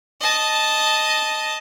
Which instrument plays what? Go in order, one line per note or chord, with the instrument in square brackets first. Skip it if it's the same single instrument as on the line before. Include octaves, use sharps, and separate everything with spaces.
[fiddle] D#5 A5